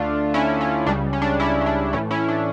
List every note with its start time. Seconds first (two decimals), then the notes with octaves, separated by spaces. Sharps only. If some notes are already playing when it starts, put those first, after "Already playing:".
Already playing: D2 D3 A3 D4 F4
0.34 C#4 E4
0.61 C#4
0.86 C#2 C#3 G3 D4
1.13 C#4
1.22 D4
1.40 C#4 E4
1.61 C#4
1.66 D4
1.93 A2 E3 A3 C#4 E4
2.11 C#4 E4
2.28 D4